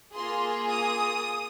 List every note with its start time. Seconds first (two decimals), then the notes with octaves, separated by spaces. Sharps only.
0.14 A#3 F4 G#4 C6
0.69 D#6